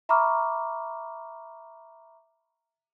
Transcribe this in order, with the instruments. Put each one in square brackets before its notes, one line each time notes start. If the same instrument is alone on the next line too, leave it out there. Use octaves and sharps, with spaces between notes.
[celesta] E5 A#5 B5 C#6 D6 F6